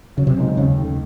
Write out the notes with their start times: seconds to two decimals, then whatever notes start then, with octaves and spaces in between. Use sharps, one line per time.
0.17 F#2 C#3
0.27 C3
0.38 C#3 G#3 C4 D#4
0.57 D#2 C#3
0.78 D#3 A3